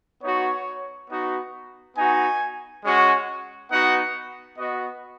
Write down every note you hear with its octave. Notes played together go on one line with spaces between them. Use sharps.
B3 D#4 F#4 C#5
B3 D#4 F#4
B3 D#4 F#4 G#5
G#3 C#4 F#4
B3 D#4 F#4 F#5
B3 F#4 D#5